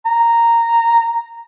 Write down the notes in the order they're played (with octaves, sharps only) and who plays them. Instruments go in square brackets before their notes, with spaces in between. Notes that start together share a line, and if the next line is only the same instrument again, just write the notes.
[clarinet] A#5